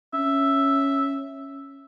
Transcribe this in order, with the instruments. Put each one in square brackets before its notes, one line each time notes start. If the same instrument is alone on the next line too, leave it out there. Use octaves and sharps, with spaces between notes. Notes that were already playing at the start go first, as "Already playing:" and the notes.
[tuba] C#4 [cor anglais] E5